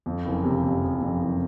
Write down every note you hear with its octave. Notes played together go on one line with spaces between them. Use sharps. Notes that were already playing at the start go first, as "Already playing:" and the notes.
F2
F#1
C3
F2
F2
F2
F#1